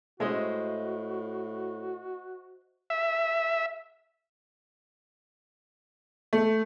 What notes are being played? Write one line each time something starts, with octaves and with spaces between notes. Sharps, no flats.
A2 G#3 F#4 C5 D#5 E5
E5
A3